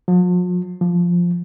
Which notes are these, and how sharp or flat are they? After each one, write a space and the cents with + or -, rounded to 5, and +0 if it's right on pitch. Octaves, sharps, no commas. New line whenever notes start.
F3 +45
F3 +0